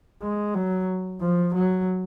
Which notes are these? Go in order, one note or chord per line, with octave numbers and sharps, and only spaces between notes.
G#3
F#3
F3
F#3